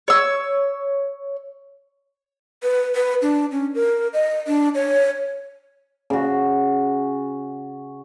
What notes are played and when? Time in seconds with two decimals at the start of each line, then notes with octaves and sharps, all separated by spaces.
0.08 C#5 E6
2.63 B4
2.95 B4
3.22 D4
3.51 C#4
3.75 A#4
4.13 D#5
4.47 D4
4.75 C#5
6.10 C#3 F#4